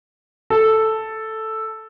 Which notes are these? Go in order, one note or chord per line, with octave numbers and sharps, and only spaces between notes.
A4